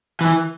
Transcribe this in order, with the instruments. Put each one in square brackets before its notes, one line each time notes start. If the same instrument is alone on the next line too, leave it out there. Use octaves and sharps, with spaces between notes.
[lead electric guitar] E3